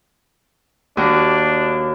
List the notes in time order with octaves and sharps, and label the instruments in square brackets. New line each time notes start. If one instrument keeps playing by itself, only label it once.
[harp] D#2 F#4 [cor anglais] D4